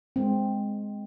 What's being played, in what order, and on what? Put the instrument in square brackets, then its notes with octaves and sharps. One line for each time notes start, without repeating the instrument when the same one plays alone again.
[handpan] G#3 C4